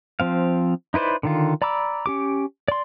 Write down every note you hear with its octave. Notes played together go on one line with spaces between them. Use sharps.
F3 C4 F5
D#4 E4 B4 C5 D5
D3 D#3 F4
D5 A#5 B5 D6 E6
C#4 G4 D6
D5 C6